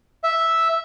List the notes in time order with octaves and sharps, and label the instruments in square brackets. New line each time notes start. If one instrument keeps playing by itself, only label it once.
[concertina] E5